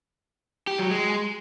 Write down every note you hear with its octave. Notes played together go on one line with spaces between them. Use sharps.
G4
F#3
G#3